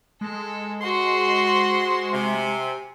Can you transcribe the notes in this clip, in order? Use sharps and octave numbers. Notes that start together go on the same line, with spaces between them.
G#3 A4
F#4 C5 C6
C3 G#5